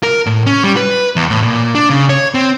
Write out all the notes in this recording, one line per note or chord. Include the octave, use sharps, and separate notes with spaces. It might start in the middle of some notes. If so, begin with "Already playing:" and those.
A#4
A2
C#4
G3
B4
E2
A2
A#2
D4
C#3
C#5
C4